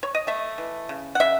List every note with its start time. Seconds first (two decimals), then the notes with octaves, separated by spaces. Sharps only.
0.03 C#5
0.15 D#5
0.27 A3 E5
0.58 E3
0.89 C#3
1.15 F#5
1.20 C#3 E5